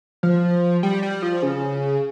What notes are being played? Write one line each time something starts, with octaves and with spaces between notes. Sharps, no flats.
F3
G3
G3
F3
C#3